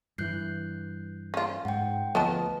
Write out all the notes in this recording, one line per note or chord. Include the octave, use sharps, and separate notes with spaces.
G2 E3 F#6 G6 C7
C#4 F4
G#2 F#5 G5
D2 F3 B3 B4 D#5 A5